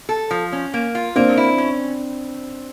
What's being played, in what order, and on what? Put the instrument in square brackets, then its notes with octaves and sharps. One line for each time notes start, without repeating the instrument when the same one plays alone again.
[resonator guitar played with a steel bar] A4
F3
C#4
A#3
F4
[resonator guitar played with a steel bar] A#3 [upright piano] C4 D4
[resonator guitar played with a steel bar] E4
C#4